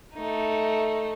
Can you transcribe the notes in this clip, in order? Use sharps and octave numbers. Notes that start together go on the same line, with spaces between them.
A3 D#4